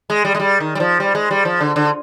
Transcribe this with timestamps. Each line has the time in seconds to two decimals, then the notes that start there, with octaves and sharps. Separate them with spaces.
0.10 G#3
0.25 G3
0.35 G#3
0.40 G3
0.60 D#3
0.75 G3
0.80 F3
1.00 G3
1.15 G#3
1.31 G3
1.45 F3
1.61 D3
1.76 D3